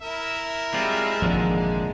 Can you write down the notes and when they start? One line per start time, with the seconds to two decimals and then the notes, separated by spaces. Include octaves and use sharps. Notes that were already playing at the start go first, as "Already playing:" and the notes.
0.02 E4 A#4 E5
0.74 G3 G#3 C4 F4
1.22 G#1 F2 A#2 D3 F3